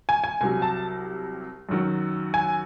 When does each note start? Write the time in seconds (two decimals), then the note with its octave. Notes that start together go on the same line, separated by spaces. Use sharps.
0.09 G#5
0.24 G#5
0.41 C2 C3 F#3 G#5
0.62 A5
1.69 F#2 D#3 F#3
2.34 G#5